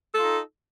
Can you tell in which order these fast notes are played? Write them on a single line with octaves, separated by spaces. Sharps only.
A4 F4 D#4